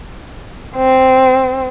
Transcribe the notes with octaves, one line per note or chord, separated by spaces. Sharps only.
C4